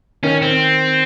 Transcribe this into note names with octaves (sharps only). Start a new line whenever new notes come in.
D#3 C#4
C4